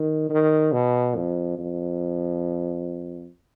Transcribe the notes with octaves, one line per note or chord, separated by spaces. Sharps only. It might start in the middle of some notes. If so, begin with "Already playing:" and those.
Already playing: D#3
D#3
B2
F2
F2